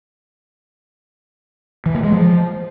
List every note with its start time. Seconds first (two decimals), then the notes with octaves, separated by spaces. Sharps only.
1.86 E3
1.95 A#3
2.03 G#3
2.12 F3